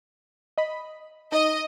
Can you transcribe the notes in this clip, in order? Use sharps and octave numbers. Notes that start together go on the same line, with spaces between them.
D#5 B5
D#4 D#5